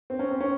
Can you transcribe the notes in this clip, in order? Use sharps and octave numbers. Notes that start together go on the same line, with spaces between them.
C4
C#4
C4
C#4